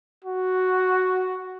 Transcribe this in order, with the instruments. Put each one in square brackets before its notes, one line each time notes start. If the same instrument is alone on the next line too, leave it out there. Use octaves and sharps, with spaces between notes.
[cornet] F#4